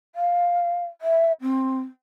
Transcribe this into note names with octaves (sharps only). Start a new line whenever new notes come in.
F5
E5
C4